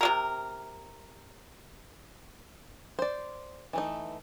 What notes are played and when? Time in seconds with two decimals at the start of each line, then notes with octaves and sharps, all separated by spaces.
0.01 C3 G#3 A#4
2.99 C5 D5
3.73 E3 A3 D#4